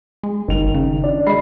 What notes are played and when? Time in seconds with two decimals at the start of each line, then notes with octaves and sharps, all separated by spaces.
0.23 G#3
0.48 G1 D#3 F7
0.74 C#3
1.04 D4
1.27 G#3 D#5 B5 C7